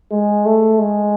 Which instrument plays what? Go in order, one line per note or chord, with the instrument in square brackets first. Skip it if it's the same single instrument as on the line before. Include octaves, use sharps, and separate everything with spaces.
[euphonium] G#3
A3
G#3